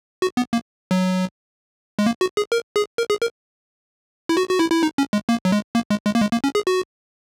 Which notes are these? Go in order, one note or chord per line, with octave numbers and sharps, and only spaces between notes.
F#4
B3
A#3
F#3
G#3
A#3
F#4
G#4
A#4
G#4
A#4
G#4
A#4
E4
F#4
F#4
E4
E4
D#4
C#4
G#3
A#3
F#3
G#3
A#3
G#3
G#3
A#3
G#3
A#3
C#4
G#4
F#4